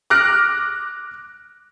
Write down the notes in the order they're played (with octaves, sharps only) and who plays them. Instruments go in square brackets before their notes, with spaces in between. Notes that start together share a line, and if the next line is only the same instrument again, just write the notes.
[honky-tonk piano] D6 F6 F#6 A#6 D7